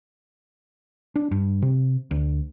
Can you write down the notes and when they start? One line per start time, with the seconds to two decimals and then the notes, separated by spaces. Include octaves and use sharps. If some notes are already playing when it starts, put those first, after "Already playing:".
1.16 D4
1.31 G2
1.62 C3
2.11 D2